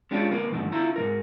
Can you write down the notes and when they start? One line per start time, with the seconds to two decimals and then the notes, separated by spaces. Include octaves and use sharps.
0.11 G#3 C#4 D4 F4 G4
0.31 D2 A#3 B4
0.50 E2 G2 D3 D#3 A3
0.72 D3 E4 F4 A#5
0.96 G#2 E3 A#4